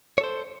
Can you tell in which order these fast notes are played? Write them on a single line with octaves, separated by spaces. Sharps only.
C#5 A4 C5